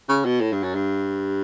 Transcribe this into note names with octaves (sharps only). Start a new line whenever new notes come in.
C#3
B2
A2
G2
F#2
G2